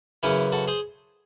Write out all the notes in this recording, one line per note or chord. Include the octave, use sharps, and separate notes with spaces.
F#2 C#3 E3 C#4 E4
F#4 A4
G#4 C5